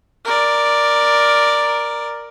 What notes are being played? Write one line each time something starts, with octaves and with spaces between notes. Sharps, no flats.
A#4 D5